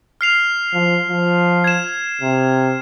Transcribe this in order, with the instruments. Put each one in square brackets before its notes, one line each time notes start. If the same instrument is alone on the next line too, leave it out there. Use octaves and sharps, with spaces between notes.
[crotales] F6 C7 F7
[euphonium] F3
F3
[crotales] G#6 E7
[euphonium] C3